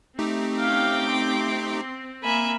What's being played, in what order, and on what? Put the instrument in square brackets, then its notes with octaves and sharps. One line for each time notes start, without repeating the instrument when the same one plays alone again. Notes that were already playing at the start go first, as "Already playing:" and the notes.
[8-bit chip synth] A3 D#4 G4 [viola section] C4
[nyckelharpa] C#4 F5 [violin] G5 D6
[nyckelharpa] C6
[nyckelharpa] A#3 B5 [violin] E5 G#5